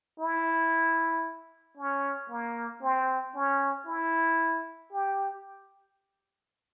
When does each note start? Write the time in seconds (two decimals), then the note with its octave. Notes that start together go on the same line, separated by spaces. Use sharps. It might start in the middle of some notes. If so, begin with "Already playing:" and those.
0.20 E4
1.77 C#4
2.30 A#3
2.82 C4
3.35 C#4
3.87 E4
4.92 G4